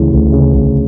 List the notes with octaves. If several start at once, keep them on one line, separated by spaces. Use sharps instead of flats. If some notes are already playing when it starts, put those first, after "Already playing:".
Already playing: D2 C#3 E3
D2
C#3
D2